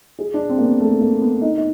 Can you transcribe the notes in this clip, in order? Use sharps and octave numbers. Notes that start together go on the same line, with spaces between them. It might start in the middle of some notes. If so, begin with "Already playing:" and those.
G#4
D4
C4
A#3
B3
A3
A#3
B3
D#4
D#4